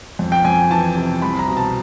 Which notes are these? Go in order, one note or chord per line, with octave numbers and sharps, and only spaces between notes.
F2
G5
F2 G#5
E3 A5
C3
C2 B5
A#5
B2
A5